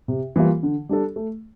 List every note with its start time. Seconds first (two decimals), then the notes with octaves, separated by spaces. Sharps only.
0.08 C3
0.36 E3 G3 A#3 F4
0.63 D3
0.89 G3 D4 A4
1.16 A3